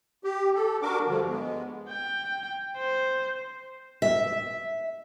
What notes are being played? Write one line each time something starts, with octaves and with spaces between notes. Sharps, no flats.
G4
A4
D4 F#4 A#4 D6
G2 D3 F3
G#3 B3
G5
C5
E5